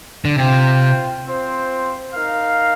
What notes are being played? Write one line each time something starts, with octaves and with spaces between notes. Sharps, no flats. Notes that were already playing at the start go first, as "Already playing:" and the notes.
D3
C3 F4 C5 G5
C4 F4 C5
D#4 A#4 F5